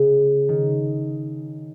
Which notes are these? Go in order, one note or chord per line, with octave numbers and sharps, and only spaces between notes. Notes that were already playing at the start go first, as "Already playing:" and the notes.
Already playing: C#3
D#3